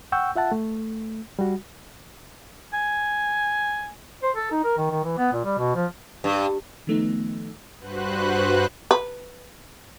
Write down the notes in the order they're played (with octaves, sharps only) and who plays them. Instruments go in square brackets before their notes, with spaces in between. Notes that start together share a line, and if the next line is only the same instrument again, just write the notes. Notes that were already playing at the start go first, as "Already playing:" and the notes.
[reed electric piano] F#5 G5 C#6 E6 G6
F4 E5 F#5 A5
A3
G3 F#4
[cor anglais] G#5
[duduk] C5
A4
D#4
A#4
D#3
D#3
E3
B3
A#2
G3
B2
F3
[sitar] G2
[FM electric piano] D#3 F3 A3 B3 D#4
[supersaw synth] G2 F#4 B4 C5 F#6
[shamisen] B4